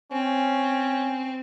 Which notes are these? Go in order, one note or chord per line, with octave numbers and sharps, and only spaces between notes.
C4 C#4